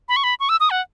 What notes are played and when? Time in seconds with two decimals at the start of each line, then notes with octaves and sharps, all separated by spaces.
0.09 B5
0.16 C#6
0.24 B5
0.40 C#6
0.49 E6
0.60 D#6
0.70 F#5